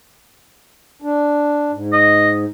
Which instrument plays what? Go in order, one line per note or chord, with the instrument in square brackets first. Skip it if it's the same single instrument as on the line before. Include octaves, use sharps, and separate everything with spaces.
[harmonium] D4
G#2
[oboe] D#5